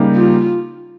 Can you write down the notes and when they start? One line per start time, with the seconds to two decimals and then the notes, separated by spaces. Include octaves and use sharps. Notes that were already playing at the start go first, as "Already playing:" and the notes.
Already playing: C#3 G3 A#3 D#4 G4
0.16 F4